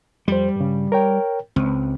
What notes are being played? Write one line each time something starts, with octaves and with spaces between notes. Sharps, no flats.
F2 G3 C5
G2 C#3
A#4 C#5 G5
C#2 C4